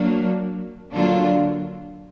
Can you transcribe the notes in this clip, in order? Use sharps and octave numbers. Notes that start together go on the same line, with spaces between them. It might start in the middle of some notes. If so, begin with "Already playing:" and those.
Already playing: F#3 A#3 D4
D3 F#3 A#3 D4 F4